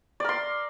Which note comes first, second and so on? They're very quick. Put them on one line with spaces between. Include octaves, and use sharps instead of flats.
D5 A#4 C6